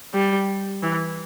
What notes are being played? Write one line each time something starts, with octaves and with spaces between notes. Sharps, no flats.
G3
E3